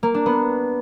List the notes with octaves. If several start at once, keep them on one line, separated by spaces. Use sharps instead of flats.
A#3
D4
B3